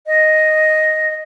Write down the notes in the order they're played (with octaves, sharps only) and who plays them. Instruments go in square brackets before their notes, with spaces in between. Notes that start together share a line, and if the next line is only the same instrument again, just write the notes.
[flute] D#5